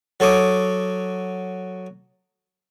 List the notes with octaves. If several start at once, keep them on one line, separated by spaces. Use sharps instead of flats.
F#3 A4 C#5 D6 D#6